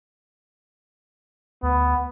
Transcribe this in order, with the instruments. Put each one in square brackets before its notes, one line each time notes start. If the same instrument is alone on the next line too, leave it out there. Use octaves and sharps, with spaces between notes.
[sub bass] D2 [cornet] B3